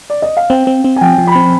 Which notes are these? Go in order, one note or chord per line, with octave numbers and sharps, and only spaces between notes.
D5
D#5
F5
C4 G5
C4
C4
G#5
F3 G5
F3
B5
C4